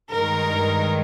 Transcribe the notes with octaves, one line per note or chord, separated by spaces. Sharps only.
G2 D#3 G#3 A#4